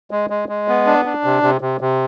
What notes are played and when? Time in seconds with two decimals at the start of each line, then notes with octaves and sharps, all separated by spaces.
0.11 G#3
0.30 G#3
0.49 G#3
0.68 B3
0.86 D4
1.05 D4
1.24 C3
1.43 C3
1.61 C3
1.81 C3